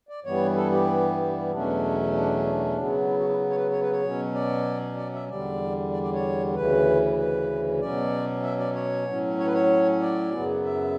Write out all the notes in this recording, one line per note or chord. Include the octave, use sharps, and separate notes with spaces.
D5
G2 E3 G3 B3 C#5
A4
G4
E2 B2 F#3 A3 C#4 D4
D4
D4
C#3 F#3 B3
E4
F#4
E4
C#5
B4
C#5
B4
C#5
B2 F#3 C#4
D5
D5
E5
E2 D3 G3 D5
D5
D5
C#5
D2 C#3 E3 B4
B4
B2 F#3 C#4 D5
E5
D5
C#5
A2 F#3 C#4
C#5
B4
C#5
D5
F#2 C#3 F#3 B3
E5